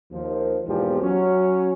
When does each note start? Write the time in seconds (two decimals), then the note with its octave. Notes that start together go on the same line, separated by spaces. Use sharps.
0.12 D#2 F3
0.67 B1 E2 G#2 F3 A#3 G4
1.01 F#3 C#4